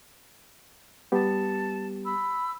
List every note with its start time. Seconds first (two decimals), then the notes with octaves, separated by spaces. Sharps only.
1.12 G3 B3 G4 A5
2.05 B5 E6